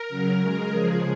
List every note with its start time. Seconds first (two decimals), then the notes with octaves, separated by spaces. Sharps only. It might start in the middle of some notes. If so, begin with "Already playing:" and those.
Already playing: A#4
0.09 C#3 F#3
0.39 C#3 G#3
0.69 C#3 F3 G#3 G#4